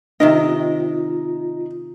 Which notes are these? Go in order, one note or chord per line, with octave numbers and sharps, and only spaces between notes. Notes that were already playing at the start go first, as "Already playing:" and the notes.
C3 D#3 D#4 F4 A#4 D#5